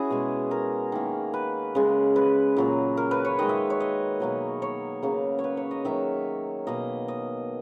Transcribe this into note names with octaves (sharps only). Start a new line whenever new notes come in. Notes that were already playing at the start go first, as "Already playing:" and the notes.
Already playing: C#4 E4 F#4 G#4
B2 G#3
A#4
D#3 A#3
B4
C#3 G#3
B4
A#2 F#3 A#3
A#4
B4
C#5
D#3 G#3 D#5
E5
C#5
D#5
B2 F#3 A#3
C#5
C#3 F#3 A#3
C#5
B4
C#5
D#5
D#3 F#3 A#3 E5
B2 A#3 D#5
D#5